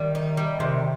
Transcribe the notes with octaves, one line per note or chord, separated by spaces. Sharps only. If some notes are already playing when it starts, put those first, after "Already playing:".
Already playing: D#3 G3
D#4
G3
C3 D#3